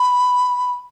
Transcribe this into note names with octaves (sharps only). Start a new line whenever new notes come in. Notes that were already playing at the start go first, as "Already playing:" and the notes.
Already playing: B5